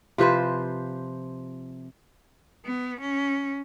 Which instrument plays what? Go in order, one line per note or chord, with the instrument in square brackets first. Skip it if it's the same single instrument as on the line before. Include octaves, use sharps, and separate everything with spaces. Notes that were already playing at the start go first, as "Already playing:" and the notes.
[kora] C3 F3 B4 C5
[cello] B3
C#4